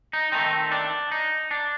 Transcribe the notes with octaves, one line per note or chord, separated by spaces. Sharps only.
D#4
D#3 A3 C4 D#4
D4
D#4
D4